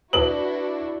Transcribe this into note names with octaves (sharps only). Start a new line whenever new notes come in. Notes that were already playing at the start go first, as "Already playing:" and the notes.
D4 E4 F#4 B4 F#5 A5 F#7